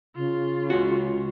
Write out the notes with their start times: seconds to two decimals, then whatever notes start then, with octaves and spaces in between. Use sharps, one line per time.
0.16 C#3 F4
0.70 C#2 C#4 F#4